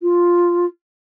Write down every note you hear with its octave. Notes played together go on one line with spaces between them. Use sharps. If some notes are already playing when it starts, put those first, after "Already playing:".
F4